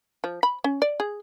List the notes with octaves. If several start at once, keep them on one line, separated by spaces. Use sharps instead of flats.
F3
B5
C#4
D5
G#4